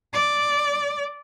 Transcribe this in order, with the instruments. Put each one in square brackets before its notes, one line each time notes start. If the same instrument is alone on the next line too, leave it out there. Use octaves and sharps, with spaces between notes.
[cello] D5